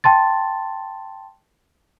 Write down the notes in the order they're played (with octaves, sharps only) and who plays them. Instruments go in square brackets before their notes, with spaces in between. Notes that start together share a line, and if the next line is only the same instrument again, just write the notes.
[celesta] G5 A5 C6 A6